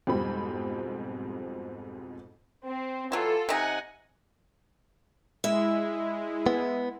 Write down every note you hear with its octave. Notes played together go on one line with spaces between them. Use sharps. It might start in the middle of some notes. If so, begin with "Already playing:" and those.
F2 G#2 B2 G3 C4 B5
C4
E3 F#3 F4 A4
C3 D#4 F#5 G#5
G#3 E4 E5
B3